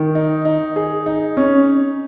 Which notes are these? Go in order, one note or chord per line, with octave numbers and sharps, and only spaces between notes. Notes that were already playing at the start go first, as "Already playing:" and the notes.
Already playing: D#3
D#4
D#4
G#4
D#4
C#4